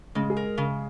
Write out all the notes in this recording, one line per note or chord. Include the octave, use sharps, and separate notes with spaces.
C#3 G#3
G#4
A#4
C#3